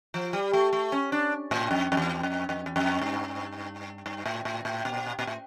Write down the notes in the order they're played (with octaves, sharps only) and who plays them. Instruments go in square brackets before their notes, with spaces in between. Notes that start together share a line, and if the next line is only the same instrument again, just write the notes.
[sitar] F3
G3
A3
A3
C#4
D4
A2
F2
F2
E2
F2
F2
E2
F2
G2
G2
A2
A2
A2
A#2
A#2
A2